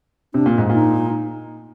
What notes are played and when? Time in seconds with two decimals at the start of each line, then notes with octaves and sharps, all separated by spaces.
0.34 C3 D4
0.46 A#2
0.58 G#2
0.70 A#2 D#4